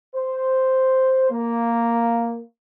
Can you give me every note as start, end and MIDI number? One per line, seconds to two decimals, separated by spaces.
0.14 1.26 72
1.30 2.41 58